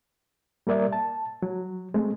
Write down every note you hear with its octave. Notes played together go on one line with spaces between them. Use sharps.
G3 A#3 A#4 D5 E5
A5
F#3
G#3 A3 C4